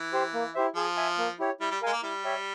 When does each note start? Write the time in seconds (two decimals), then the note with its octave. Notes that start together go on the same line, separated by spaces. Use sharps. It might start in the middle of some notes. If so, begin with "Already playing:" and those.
Already playing: E3
0.13 G4 C5
0.34 A#3
0.55 E4 G4 C5 E5
0.76 F3 G#4
0.97 E5 G#5
1.18 A#3
1.39 E4 G4 C#5
1.60 G3 E4
1.71 G3
1.82 G#3 A#4 F5 G#5
1.93 A#3
2.03 G3 E4
2.24 G4 C#5 E5